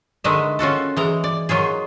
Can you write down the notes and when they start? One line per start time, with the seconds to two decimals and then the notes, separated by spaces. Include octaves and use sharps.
0.24 D3 D#3 G#3 B4 D#5 E5
0.59 C#4 F4 F#4 A4
0.97 E3 G#3 A#5
1.24 D5
1.49 D#3 F#3 F4 G#4